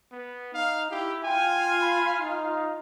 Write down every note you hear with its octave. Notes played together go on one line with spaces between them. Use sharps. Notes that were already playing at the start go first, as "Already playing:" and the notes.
B3
D#4 F5
E4 G4
F4 F5 G5 G#5
B5
D#4